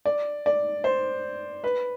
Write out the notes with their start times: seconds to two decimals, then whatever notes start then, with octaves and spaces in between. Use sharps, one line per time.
0.06 D5
0.46 D5
0.84 C5
1.64 B4